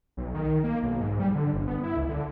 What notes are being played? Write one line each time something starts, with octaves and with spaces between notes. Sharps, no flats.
B1
D#3
A#3
B1
G#2
G3
D3
G1
B3
E4
C#2
D3